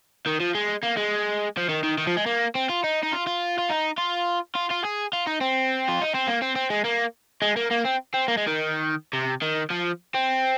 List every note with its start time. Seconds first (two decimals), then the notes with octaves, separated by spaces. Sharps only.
0.26 D#3
0.40 F3
0.55 G#3
0.83 A#3
0.97 G#3
1.57 F3
1.69 D#3
1.83 D#3
1.98 D#3
2.07 F3
2.17 G#3
2.26 A#3
2.55 C4
2.69 F4
2.84 D#4
3.03 D#4
3.12 F4
3.26 F4
3.58 F4
3.70 D#4
3.98 F4
4.55 F4
4.70 F4
4.84 G#4
5.13 F4
5.27 D#4
5.41 C4
5.89 F4
6.02 D#4
6.15 C4
6.27 A#3
6.42 C4
6.56 C4
6.70 G#3
6.85 A#3
7.42 G#3
7.56 A#3
7.71 A#3
7.85 C4
8.14 C4
8.28 A#3
8.37 G#3
8.47 D#3
9.13 C3
9.42 D#3
9.71 F3
10.14 C4